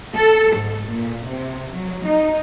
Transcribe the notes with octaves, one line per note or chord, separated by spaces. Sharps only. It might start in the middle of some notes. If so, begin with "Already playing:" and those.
A4
G#2
A#2
C3
F#3
D#4